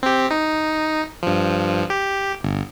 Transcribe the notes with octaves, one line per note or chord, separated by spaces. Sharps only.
C4 G4
D#4
G2 F3
G4
G1